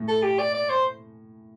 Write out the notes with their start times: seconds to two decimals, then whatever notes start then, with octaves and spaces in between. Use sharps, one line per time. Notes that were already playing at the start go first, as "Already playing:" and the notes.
Already playing: A2
0.08 A4
0.23 G4
0.39 D5
0.54 D5
0.70 C5